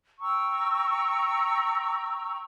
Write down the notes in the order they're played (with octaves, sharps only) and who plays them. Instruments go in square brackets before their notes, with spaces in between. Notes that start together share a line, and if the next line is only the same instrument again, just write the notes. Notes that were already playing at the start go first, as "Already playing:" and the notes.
[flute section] G5 A#5 C#6 E6